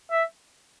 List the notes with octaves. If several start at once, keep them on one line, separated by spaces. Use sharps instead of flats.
E5